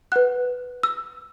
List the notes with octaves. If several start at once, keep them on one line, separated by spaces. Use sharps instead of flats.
B4 F#5 F#6
E6